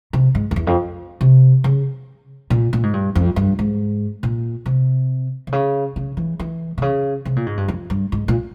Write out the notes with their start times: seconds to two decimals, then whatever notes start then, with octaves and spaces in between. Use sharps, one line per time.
0.13 C3
0.35 G#2
0.51 F2
0.56 E2
0.67 F2
1.21 C3
1.64 C#3
2.50 A#2
2.73 A#2
2.83 G#2
2.93 G2
3.15 F2
3.36 G2
3.59 G#2
4.23 A#2
4.66 C3
5.47 C3
5.52 C#3
5.96 C#3
6.17 E3
6.40 E3
6.78 C3
6.82 C#3
7.25 C3
7.36 A#2
7.46 G#2
7.57 G2
7.68 F2
7.90 G2
8.12 G#2
8.28 A#2